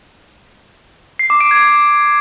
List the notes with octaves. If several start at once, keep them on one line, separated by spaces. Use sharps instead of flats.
C7
D6
D7
G#6